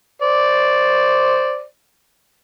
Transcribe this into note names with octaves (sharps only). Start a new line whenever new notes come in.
C5 D5